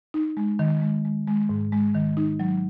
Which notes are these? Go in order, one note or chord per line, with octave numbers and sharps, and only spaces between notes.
D#4
G#3
D#3
G#3
G#3
G#3
G#2
G#3
D#3
D#4
F#3